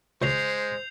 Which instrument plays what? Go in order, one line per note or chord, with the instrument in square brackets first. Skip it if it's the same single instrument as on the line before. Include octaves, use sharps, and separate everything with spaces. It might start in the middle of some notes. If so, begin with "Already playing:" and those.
[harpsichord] C#2 C#5 A#5 [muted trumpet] G#3 [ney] C5 [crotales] G6 C7 F7